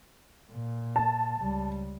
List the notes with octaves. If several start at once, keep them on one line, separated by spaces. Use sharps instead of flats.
A#2
A5
C#2 G3